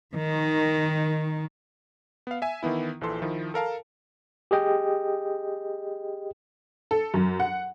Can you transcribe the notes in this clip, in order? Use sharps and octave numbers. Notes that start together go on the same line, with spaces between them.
D#3
B3 F5
E5 G#5
D#3 E3 B3 E4
A#1 E3 F3 A4 C6
D#3 F3 E4
A4 A#4 F5 A5
G4 G#4 D#5 G5
A4
F#2
F#5